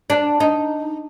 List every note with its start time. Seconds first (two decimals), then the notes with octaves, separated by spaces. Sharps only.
0.10 D4
0.40 D#4